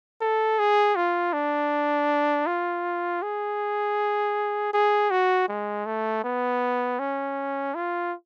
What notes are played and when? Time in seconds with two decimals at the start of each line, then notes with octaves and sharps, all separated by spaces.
0.21 A4
0.59 G#4
0.96 F4
1.33 D4
2.46 F4
3.22 G#4
4.74 G#4
5.11 F#4
5.49 G#3
5.86 A3
6.24 B3
6.99 C#4
7.75 F4